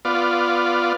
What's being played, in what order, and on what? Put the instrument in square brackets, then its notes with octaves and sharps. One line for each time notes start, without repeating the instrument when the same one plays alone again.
[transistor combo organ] B3 F4 D5